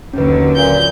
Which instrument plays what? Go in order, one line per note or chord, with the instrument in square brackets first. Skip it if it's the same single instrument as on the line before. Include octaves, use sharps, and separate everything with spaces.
[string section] D#2 D3 F#3 [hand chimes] C#4 B4
[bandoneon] A#2 [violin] G6